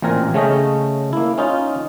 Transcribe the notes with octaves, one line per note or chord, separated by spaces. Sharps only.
A1 A#2 C4 A#4 G#5
C#3 A3 C#4 D#5 G5
A#3 E4
C#4 D#4 F4